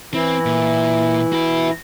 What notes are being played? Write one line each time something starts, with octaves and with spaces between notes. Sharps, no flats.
E3 C4 E4
A#2
F#4 B5